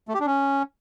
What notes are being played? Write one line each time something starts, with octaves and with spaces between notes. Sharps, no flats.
A3
G4
D4
C#4